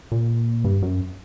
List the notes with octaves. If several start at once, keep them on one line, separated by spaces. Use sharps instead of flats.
A#2
G2
F#2